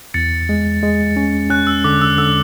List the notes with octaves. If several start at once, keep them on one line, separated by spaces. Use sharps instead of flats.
E2 A6 C#7
G#3
G#3
C#4
C#4 F#6
E6
D3 D6
E6
D3 E6